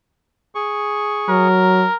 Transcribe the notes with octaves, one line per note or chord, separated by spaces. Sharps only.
G#4 C#6
F#3 A#4